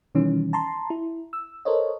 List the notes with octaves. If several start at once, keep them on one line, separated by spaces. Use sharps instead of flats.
B2 D#3 E3 G3 C#4
A5 A#5 C6
E4
E6
A4 A#4 C5 C#5 D#5